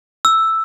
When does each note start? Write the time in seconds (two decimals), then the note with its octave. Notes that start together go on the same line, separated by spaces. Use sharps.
0.25 E6